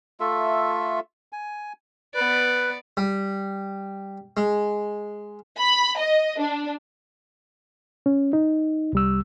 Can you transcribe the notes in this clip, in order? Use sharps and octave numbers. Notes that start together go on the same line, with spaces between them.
A3 F4 A4 E5
G#5
B3 B4 D5
G3
G#3
B5
D#5
D4
C#4
D#4
C2 G3 E6